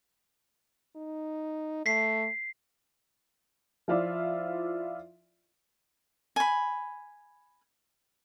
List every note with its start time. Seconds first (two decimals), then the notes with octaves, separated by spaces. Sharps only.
0.96 D#4
1.86 A3 B6 C7
3.88 F3 E4 F4 D5 E5
6.36 G#5 B5